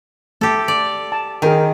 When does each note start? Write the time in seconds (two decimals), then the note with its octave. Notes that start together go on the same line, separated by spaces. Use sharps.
0.41 A3 G4 A4
0.68 D5
1.12 A5
1.42 D#3 G#4 A#4 G5